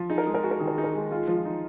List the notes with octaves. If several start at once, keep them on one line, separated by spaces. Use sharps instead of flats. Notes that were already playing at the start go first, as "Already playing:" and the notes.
Already playing: F3
D#4 G#4
A#4
G#3 G#4
A#4
F#4 G#4
A#4
D#3 G#4
A#4
D#4 G#4
A#4
G#3 G#4
G#3 F4
F3
F4
D#4